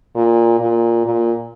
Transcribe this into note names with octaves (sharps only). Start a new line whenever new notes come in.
A#2
A#2
A#2